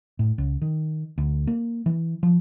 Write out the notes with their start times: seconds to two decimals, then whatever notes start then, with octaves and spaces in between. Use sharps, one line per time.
0.19 A2
0.38 C#2
0.62 D#3
1.18 D2
1.47 A#3
1.86 E3
2.23 F3